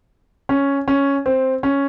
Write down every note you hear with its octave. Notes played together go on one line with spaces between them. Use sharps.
C#4
C#4
C4
C#4